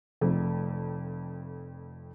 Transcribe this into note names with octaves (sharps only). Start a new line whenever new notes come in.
F1 F2 A3